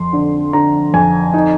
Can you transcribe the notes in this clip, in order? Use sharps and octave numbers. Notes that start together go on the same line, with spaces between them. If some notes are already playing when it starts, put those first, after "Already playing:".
Already playing: F2 C6
D3
D3 A#5
F2 G#5
D#4